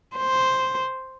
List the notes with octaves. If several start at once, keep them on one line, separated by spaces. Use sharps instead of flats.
C5